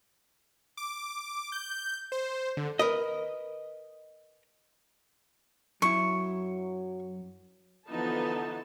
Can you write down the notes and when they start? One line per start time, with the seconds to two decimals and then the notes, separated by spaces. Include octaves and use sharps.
0.77 D6
1.52 G6
2.12 C5
2.57 D3
2.79 A#4 B4 D#5
5.82 F#2 F#3 E4 C#6
7.87 D3 E3 F3 B3 D#4 A5